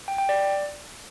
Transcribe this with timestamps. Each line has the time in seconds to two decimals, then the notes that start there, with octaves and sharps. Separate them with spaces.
0.08 G5
0.18 G5
0.29 D5